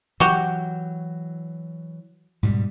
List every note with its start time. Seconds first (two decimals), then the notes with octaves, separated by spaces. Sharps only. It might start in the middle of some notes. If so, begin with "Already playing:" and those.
0.20 E3 F#3 F#4 G4
2.43 G#2 B2 G3